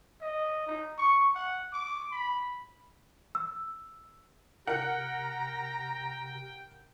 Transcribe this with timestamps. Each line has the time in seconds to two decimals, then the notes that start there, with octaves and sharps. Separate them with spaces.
0.21 D#5
0.67 D#4
0.98 C#6
1.35 F#5
1.73 D6
2.11 B5
3.35 E6
4.67 C3 A#4 F#5 G5 A#5